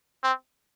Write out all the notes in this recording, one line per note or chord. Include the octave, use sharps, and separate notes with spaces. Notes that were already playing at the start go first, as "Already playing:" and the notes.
C4